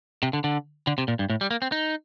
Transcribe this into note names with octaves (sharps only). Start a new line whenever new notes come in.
C3
D3
D3
D3
C3
A#2
G2
A2
G3
A#3
C4
D#4